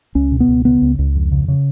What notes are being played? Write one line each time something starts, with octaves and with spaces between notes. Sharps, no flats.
C#2 C#4
B2
B3
C#2
C#3 B3
C#2
C#2
F2
C#3
C#3